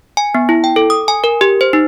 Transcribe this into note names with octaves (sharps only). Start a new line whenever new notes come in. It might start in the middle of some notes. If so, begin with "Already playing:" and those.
G#5
B3
E4
G5
A4
D#6
G#5
A#4
G4
C5
D#4